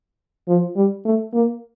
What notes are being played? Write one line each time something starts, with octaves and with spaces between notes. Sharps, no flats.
F3
G3
A3
A#3